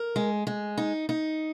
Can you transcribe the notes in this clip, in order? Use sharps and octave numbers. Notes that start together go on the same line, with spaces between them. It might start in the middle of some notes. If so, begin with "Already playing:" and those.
Already playing: A#4
G#3
G#3
D#4
D#4